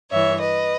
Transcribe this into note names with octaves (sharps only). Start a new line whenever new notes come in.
G2 E3 C#5 E5
B4 D#5